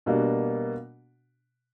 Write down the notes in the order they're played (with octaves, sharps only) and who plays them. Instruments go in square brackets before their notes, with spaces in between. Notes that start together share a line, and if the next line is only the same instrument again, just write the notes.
[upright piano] B2 G3 A#3 D4 F#4